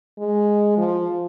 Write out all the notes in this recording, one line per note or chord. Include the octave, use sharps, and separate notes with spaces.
G#3
F3